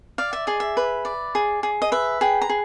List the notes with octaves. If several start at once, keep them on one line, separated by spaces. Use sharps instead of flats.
D5 F5
E5
G#4 D#5
E5
B4
D5
G#4
G#4
D#5
B4 E5
G#4 G5
A#5
G#4